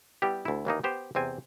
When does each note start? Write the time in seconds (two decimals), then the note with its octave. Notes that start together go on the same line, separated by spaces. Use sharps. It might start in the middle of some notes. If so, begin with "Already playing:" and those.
0.22 G3 B3 E4 G4
0.45 D2 E4
0.65 D#2 E3 A#3 D#4
0.84 B3 G4 C5
1.15 E2 C3 C4 G#5